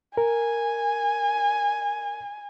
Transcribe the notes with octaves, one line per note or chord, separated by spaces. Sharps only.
A#4 G#5